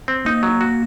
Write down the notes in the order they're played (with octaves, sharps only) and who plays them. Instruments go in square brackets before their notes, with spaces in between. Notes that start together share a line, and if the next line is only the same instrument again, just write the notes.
[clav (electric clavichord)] C4
[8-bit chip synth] A#3 [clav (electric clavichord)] D#4
[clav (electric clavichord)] F#3
F#4